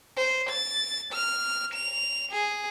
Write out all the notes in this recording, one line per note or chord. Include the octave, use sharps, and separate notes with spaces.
C5
A6
F6
F7
G#4